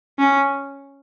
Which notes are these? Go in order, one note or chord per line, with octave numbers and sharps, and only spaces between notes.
C#4